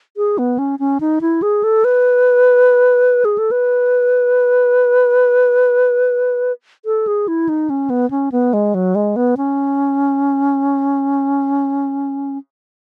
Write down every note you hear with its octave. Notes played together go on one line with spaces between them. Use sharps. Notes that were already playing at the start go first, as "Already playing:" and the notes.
G#4
B3
C#4
C#4
D#4
E4
G#4
A4
B4
G#4
A4
B4
A4
G#4
E4
D#4
C#4
B3
C#4
B3
G#3
F#3
G#3
B3
C#4